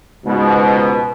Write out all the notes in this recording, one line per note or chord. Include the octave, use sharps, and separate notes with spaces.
C#2 G#2 B2